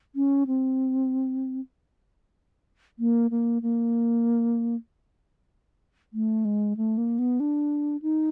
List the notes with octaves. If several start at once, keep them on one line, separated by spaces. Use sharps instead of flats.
C#4
C4
A#3
A#3
A#3
A3
G#3
A3
A#3
B3
D4
D#4